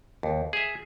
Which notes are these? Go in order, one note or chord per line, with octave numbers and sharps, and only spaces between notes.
D#2
G#4 E5